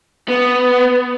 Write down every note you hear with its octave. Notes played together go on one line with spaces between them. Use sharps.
B3